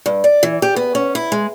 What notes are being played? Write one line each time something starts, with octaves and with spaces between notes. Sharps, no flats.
G2
D5
E3
G4
B3
C#4
E4
G#3